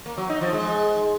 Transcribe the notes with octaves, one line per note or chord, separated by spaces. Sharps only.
A#3
F#3
D#4
F3
G#3